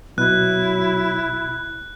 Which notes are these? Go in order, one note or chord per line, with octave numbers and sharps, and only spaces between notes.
B2 F#3 E4 F#6